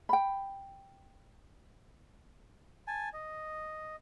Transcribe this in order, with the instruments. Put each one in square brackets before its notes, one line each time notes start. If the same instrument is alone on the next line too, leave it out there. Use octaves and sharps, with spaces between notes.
[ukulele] G5 B5
[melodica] G#5 A5
D#5